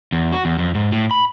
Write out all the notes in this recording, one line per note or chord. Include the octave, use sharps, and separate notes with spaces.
E2
F#4
E2
F2
G#2
A2
B5